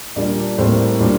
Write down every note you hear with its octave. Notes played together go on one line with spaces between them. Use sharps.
A#2 G3 A#3 D4 D5
A2 G3 A#3 C4 C5
A#2 G3 D4